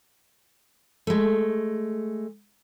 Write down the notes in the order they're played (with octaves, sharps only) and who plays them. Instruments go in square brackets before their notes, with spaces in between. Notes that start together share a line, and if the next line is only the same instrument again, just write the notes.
[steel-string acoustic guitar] G#3 A3